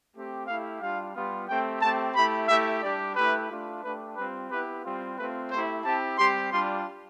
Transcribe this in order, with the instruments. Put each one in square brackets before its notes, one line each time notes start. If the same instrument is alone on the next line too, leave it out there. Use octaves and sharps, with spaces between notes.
[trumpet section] A3 C4 G4
A3 E4 G4 F5
G3 D4 F4 F5
G3 B3 F4
A3 C4 G4 G5
A3 C4 G4 A5
A3 E4 G4 B5
A3 E4 G4 E5
G3 D4 G4 D5
A3 E4 G4 B4
A3 D4 F4
A3 D4 G4 B4
G3 C4 F4 B4
B3 E4 G4 B4
G3 C4 F4
A3 C4 F4 B4
A3 E4 G4 C5
C4 E4 G4 A5
G3 C4 G4 C6
G3 D4 F4 C6